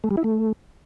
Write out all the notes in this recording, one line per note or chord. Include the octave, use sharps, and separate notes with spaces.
A3
G3
E4
A3